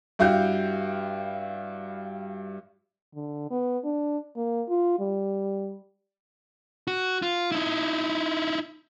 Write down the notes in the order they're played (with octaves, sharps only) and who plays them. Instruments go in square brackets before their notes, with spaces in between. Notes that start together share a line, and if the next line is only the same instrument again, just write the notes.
[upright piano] G2 E4 F#4 F5 G5 G6
[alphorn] D3
B3
D4
A#3
F4
G3
[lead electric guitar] F#4
F4
D#4 E4